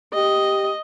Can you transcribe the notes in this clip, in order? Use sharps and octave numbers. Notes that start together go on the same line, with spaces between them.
G4 D#5